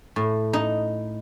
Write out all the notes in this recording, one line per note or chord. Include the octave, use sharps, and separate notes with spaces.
A2
D#4